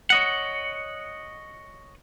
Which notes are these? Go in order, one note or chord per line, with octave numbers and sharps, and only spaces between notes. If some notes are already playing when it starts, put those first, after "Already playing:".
C#5 D#5 F#5